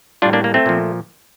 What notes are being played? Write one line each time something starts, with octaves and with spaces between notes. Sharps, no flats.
A2 G3 D4 F4
A#3 D4
A#3
A3 C4
A#2 F3